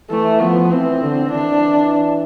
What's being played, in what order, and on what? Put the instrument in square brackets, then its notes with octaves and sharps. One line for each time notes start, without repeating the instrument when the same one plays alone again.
[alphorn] E3 [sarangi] A3
[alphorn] F3 [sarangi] B3
[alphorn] E3 [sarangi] C4
[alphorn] D3
[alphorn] E3 [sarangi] D4
[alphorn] E3